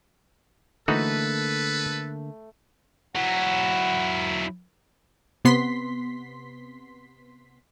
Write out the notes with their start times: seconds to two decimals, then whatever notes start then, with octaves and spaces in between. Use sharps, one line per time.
0.88 D3 E3 A3 A#3 D#4 F#4 A4 B4
3.15 F#3 E4 F#5
5.45 C3 B3 C6 B6